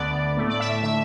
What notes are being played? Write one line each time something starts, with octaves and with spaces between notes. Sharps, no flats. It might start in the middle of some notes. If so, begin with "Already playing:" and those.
Already playing: D2 D3 B3 D5
A2 A3
D5
E5
E5
D3 A3 E5